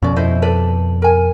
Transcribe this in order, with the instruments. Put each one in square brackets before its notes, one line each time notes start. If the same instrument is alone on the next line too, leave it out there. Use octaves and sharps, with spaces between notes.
[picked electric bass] F2 B2 [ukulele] C#4 D5
[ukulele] E4 C5 D#5
A4 B4 D5
A#4 G#5